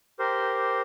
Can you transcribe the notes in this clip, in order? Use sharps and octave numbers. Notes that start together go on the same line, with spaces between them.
G4 A#4 C5